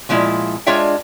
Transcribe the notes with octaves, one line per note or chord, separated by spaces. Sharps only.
A#2 F3 G#3 E4
G#3 D4 F4 C#5 E5 G5